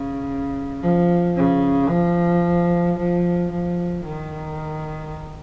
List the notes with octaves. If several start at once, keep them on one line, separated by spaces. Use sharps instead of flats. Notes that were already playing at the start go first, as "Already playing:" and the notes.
Already playing: C#3
F3
C#3
F3
F3
F3
D#3